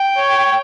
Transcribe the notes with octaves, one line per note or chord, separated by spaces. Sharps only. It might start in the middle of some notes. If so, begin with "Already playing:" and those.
Already playing: G5
C#5